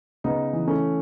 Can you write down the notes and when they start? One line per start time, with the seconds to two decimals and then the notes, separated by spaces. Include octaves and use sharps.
0.24 C#3 B3 D#4
0.53 E3
0.68 A3 C#4